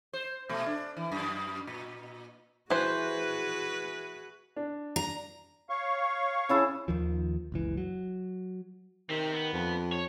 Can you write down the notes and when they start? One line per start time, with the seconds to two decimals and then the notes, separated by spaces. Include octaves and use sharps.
0.13 C5
0.49 B2 A3
0.66 D4
0.97 E3
1.11 F#2
1.67 A#2
2.70 E3 F#4 G#4 B4 C5
4.57 D4
4.96 A#5
5.70 C#5 F5 C#6
6.49 C#3 E4 A5
6.88 D#2 D#3 F3
7.52 F#1 C#2 E3
7.77 F#3
9.10 D#3 C4 G4
9.34 B3
9.53 F2
9.92 C#5